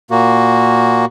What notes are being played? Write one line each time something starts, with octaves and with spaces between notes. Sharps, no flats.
A#2 A#3 F#4